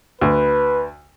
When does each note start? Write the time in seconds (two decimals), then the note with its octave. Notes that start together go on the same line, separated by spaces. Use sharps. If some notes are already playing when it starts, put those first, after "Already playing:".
0.21 D2 B4